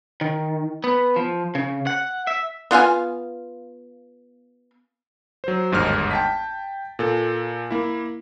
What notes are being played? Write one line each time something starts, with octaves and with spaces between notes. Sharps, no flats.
D#3
B3
F3
C#3
F#5
E5
B3 F4 F5 G#5
F#3 C5
G1 D#2 G#2 D#4 F6
G5 A5 B6
A#2 A4
A#3 E4